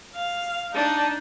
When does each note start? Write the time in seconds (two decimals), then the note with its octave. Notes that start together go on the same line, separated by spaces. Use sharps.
0.16 F5
0.74 D4 D#4